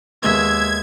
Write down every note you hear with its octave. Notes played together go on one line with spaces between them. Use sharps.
D#2 G#3 B3 E5 G#6